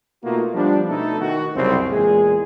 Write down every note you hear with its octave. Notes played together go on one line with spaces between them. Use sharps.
B2 A3 A#3 D#4 F4 F#4
F3 G3 B3 D4
B2 A3 D#4 E4 A4
D#3 F#4
C2 F#2 C#3 C4
E2 A#2 G#3 G#4